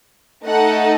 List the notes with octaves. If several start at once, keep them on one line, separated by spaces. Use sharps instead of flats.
A3 D#4 A4 F#5